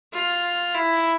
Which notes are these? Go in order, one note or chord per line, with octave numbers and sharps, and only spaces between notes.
F4
E4